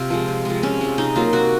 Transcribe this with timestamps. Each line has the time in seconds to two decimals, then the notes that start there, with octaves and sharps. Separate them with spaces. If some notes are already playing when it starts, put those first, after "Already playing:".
Already playing: C3 F4
0.10 F3 G#3
0.28 C3
0.45 F3 G#3
0.63 C3 C#4
0.81 F3 G#3
0.98 C3 D#4
1.16 F#3 A#3 F4
1.33 C3 F#4